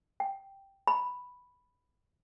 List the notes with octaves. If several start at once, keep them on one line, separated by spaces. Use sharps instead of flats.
G5
B5